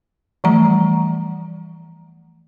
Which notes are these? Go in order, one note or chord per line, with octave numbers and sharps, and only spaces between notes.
E3 F3 G3 A3 A#5